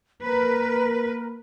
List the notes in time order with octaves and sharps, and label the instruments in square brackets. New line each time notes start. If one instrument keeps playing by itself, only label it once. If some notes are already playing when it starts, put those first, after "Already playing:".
[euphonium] A#3 [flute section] A#4 [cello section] B4